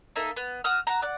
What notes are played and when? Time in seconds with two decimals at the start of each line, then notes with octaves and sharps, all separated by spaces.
0.16 A#3 D#4 A4 E5
0.36 B3
0.64 F#4 D#6 F6
0.87 F#4 A#5
1.02 D5 F#5